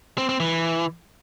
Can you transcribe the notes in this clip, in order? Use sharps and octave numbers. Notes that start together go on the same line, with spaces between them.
C4
C4
E3